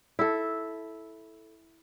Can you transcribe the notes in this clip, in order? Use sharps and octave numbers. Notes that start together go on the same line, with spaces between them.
E4 A4